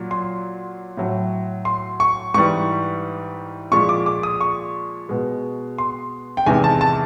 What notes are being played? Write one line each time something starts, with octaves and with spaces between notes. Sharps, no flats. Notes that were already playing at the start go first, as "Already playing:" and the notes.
Already playing: A#2 F#3
C6
A2 F#3
C6
C#6
G#2 E3 G3 C#6
A#2 F3 G#3 C#6
D6
D6
D#6
C#6
B2 G#3
C6
G5
E2 C3 D#3 G#3 G#5
A5
A5